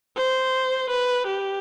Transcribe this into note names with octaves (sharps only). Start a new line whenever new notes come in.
C5
B4
G4